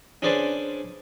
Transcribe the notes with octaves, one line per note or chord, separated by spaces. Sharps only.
C#4 D4 G#4 B4 C5 D5